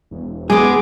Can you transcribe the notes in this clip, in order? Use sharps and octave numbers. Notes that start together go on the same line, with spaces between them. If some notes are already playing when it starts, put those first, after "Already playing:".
E1
G#3 B3 G#4 D6